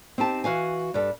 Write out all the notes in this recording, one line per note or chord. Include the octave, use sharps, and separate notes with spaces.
C4 D#4 G4 A5
E3 F#4 F5 G#5
G2 G3 A4